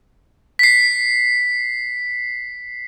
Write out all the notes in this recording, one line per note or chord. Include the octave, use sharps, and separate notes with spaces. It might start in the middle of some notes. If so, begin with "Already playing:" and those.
B6 C7